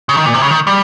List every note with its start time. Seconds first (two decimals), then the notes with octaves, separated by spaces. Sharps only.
0.09 C#3
0.17 D#3
0.26 A#2
0.34 C3
0.42 C#3
0.51 D#3
0.67 G3